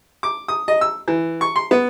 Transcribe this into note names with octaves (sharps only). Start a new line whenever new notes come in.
D6
D#6
D#5
E6
E3
C#6
C6
B3